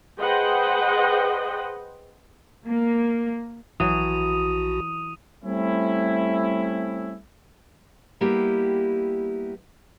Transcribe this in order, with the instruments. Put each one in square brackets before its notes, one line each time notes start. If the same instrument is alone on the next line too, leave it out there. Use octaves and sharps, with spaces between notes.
[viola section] G#4 B4 C5 D#5 F#5 G5
[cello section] A#3
[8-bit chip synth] A#1 F#4 [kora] E3 F#3 [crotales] D#6 D#7
[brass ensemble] G3 A3 C4 C#4 E4
[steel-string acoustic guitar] G3 A#3 B3 E4 G4